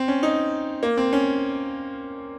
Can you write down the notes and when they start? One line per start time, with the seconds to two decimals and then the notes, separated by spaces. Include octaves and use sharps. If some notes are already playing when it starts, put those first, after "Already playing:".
Already playing: C4
0.08 C#4
0.23 D#4
0.83 A#3
0.97 C4
1.13 C#4